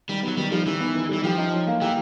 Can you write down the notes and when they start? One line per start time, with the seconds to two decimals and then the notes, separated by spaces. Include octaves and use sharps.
0.09 D#3 G3
0.23 F#3 B3
0.37 D#3 G3
0.51 F3 G3
0.66 D#3 E3
0.80 B3
0.95 D#3
1.09 E3 G3
1.24 F3 G4
1.38 D#4
1.52 F#3
1.67 A#3
1.81 E3 G4